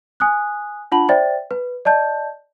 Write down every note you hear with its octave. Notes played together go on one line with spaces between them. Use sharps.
G#5 D#6 F#6
D4 F4 F#5 A5 B5 F#7
C5 D5 E5 G5 A6
B4
D5 D#5 A5 G6